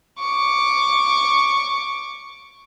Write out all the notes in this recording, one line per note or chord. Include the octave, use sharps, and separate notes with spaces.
C#6 D6